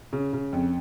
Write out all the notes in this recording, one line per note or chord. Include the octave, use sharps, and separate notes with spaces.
C#3
C#3
F2